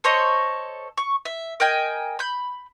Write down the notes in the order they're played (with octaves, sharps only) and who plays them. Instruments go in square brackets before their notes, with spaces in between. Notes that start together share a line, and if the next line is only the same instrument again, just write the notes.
[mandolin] A4 C5 C#5 D#5
C#6
E5
A#4 D#5 G5 G#5
B5 G6